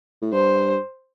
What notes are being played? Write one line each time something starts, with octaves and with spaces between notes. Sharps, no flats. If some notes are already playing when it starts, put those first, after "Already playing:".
A2
G2 C5